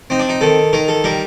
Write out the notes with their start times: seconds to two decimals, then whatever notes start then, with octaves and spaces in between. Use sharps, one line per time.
0.10 C4 D#4
0.19 D4
0.29 D#4
0.41 D#3 A4
0.73 D#3 A#4
0.88 A4
1.04 G3 A#4